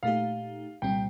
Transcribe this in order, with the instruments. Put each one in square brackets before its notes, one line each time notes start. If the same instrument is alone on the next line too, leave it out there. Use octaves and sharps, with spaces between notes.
[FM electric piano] A#2 A3 D#4 G4 [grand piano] F5
[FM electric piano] C2 A#2 G3 C4 [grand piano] G5